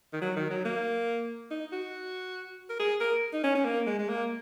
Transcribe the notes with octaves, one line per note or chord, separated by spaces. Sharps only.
D#3
F#3
D#3
F#3
A#3
D#4
F#4
A#4
G#4
A#4
D#4
C#4
C#4
A#3
G#3
G#3
A#3